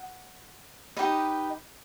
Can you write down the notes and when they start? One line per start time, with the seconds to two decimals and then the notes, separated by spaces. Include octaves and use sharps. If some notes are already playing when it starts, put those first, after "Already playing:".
Already playing: F#5
0.97 D#4 G4 B4 D#5